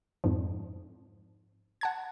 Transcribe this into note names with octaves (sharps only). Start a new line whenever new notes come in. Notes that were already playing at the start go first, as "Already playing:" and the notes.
F2 G#2 F3
F#5 A5 G#6